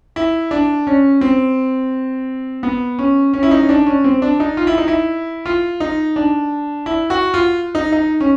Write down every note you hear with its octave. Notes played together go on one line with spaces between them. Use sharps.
E4
D4
C#4
C4
B3
C#4
C#4
E4
D#4
C#4
D4
C#4
C4
D4
D#4
F4
E4
D#4
E4
F4
D#4
D4
E4
F#4
F4
D#4
D#4
C#4